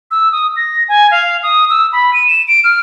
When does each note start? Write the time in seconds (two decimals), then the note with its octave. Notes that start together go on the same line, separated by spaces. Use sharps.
0.11 E6
0.32 D#6
0.57 A#6
0.89 G#5
1.11 F5
1.43 D#6
1.70 E6
1.93 B5
2.13 D#7
2.27 E7
2.48 D7
2.64 F6